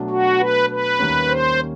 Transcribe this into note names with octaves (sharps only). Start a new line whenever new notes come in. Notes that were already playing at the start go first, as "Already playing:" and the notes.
Already playing: B2 F#3 A3 D4
F#4
B4
B4
D#2 D#3 G3 A#3 C#4
C5